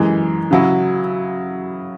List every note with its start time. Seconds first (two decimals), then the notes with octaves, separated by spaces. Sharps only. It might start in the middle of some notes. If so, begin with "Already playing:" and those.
Already playing: F#2 E3 G#3
0.51 C#3 F#3 E4